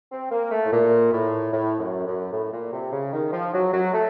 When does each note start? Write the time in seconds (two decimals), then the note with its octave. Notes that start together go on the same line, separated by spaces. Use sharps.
0.12 C4
0.31 A#3
0.51 A3
0.66 A2
0.72 A#2
1.12 A2
1.52 A2
1.79 F#2
2.06 F#2
2.33 A2
2.52 A#2
2.72 C3
2.92 C#3
3.13 D#3
3.33 F3
3.53 F#3
3.73 F#3
3.94 A3